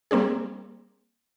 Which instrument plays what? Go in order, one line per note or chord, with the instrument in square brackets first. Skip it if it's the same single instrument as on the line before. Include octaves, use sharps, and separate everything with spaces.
[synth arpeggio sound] G3 A#3 C4 D4 G#4